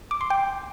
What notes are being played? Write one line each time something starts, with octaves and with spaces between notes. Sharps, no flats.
D6
C6
G5